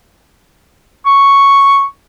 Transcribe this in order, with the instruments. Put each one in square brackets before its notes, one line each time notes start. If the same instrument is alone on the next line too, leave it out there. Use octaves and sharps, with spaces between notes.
[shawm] C#6